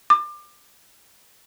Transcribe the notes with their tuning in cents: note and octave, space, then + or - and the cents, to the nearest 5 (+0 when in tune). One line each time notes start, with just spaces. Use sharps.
D6 +25